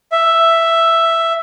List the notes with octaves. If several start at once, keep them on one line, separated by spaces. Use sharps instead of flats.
E5